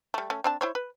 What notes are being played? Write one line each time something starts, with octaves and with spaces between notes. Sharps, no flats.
G3 A3
A3 C#4
C4 D4 A5
E4 C5 C#5
B4